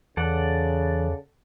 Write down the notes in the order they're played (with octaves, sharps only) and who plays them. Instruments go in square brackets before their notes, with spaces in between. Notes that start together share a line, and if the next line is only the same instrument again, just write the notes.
[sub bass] E2 [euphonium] C#3 [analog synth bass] E3 [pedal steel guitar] A4 D5 F#5